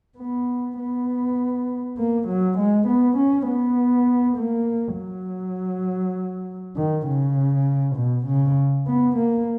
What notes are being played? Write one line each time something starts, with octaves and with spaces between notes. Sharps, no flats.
B3
B3
A#3
F#3
G#3
B3
C#4
B3
A#3
F#3
D#3
C#3
B2
C#3
B3
A#3